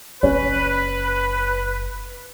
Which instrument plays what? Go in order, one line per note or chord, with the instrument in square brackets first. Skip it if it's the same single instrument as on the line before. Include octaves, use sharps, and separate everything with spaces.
[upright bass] F#1 [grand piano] C#4 [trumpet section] B4